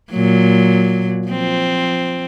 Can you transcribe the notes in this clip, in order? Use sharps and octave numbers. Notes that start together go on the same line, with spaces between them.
A#2 F#3
F3 C4